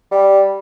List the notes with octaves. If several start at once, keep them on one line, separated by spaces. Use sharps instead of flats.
G3